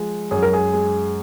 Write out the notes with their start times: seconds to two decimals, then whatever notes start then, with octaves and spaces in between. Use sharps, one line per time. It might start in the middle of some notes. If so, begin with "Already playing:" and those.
Already playing: F3 G#3
0.31 F#2 G#4
0.43 A#4
0.53 G#4
0.73 G#3